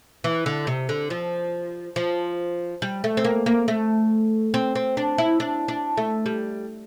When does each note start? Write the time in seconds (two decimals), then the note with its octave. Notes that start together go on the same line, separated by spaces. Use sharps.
0.24 E3
0.46 D3
0.67 C3
0.89 D3
1.10 F3
1.96 F3
2.82 G3
3.04 A3
3.17 C4
3.25 A#3
3.46 A#3
3.68 A3
4.54 C4
4.75 C4
4.97 D4
5.18 E4
5.40 D4
5.68 D4
5.97 A3
6.26 G3